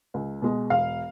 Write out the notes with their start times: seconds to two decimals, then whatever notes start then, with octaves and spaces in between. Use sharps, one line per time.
0.14 C#2
0.42 B2 G#3
0.70 E1 F5